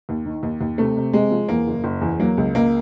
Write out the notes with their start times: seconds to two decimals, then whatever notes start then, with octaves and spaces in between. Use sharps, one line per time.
0.09 D#2
0.26 D#3
0.43 D#2
0.61 D#2
0.78 C3 A3
0.97 C3
1.13 C3 G#3
1.31 F3
1.49 E2 A#3
1.67 F#1
1.84 F#1
2.01 E2
2.19 F#3 A#3
2.37 C#2
2.55 C#2 A#3